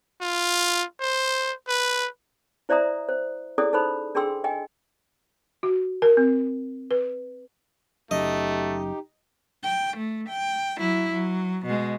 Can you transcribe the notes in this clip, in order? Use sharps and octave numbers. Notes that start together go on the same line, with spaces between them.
F4
C5
B4
E4 C5 D5 E5 A#5 D#6
C5
C#4 E4 G#4 A4 D5 D#6
D#4 A4 C5 B5
D4 G#4 A4 G5 C6 E6
D#5 G5 G#5
F#4
A#4
C4
B4
F#1 F#2 A3 D#4 G4 D#5
G5
A3
G5
F#3 E4
F#3
B2 G#3